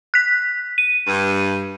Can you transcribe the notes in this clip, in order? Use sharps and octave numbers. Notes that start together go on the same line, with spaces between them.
F#6 B6
D#7
G2